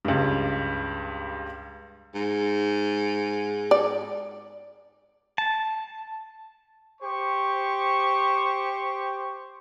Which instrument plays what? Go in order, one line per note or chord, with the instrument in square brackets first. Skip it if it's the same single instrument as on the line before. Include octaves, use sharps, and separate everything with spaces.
[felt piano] C#2 G2
[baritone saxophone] G#2
[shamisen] D5
[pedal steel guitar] A5
[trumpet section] G4 C5 C#6